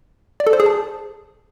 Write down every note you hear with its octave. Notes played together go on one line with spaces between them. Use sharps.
D5
A4
C5
G#4
A5